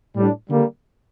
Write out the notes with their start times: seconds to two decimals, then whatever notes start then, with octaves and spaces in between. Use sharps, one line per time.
0.15 A2 G3 D4
0.50 D3 G3 A#3